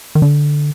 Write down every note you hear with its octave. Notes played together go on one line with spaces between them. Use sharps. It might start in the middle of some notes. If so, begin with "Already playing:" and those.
D#3
D3